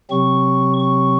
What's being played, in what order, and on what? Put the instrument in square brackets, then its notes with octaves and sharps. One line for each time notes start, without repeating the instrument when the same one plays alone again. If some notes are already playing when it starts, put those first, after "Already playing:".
[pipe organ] C3 F#3 C4 C#6
C#6